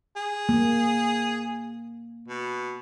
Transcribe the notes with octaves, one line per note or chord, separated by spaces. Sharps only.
G#4
A#3
B2